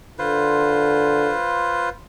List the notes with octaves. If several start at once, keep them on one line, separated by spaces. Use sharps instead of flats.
D3 F4 B4 C5